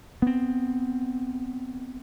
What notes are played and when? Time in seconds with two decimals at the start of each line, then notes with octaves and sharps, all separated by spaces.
0.22 B3 C4